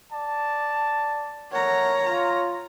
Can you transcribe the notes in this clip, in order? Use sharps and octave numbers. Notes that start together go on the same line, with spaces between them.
D5 A5
A3 A#4 C#5 F#5 A#5
F4